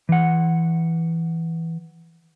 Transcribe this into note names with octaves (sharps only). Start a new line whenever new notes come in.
E3 F#5